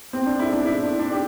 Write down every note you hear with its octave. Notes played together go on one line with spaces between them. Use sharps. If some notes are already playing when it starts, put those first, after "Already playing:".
C4
D4
E4
D4
E4
D4
D4
G4